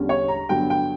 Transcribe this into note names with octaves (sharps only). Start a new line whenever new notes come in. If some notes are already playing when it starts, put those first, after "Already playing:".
Already playing: E2 D3 G3 C#4
C#5
A#5
G2 D3 F#3 B3 G5
G5